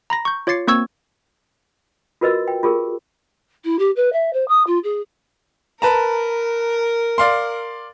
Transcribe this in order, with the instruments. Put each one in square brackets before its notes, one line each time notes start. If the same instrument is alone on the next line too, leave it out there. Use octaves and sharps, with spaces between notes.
[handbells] A#5 B5 A#6
C#6 G6
F4 C#5 D6 A6 C7 C#7
A#3 C4 C#6 E6 G#6
[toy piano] F4 F#4 A#4 B4 D#5 E6
G5
F4 G4 G#4 A#4
[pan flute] E4
G4
B4
E5
C5
D#6
F4
G#4
[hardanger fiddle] A#4 [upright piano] B4 A5 A#5
[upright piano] D5 F5 C6